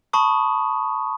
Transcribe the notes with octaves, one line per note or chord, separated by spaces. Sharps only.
A5 B5 C#6 D#6